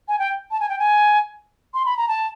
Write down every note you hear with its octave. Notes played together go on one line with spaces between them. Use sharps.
G#5
G5
A5
G#5
G5
G#5
C6
B5
A#5
A5